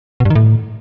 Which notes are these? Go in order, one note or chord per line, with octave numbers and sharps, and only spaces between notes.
B2
G2
D#3
A2